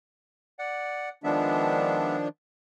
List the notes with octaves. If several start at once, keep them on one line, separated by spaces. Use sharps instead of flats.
D5 F#5
D#3 F3 G#3 B3 D4 E5